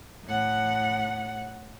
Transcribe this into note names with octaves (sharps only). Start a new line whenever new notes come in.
A2 F#5